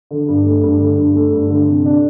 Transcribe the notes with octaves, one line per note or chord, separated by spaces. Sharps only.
D3
G2
A3
G2
D3
G2
A3
G2
D3
C3
D4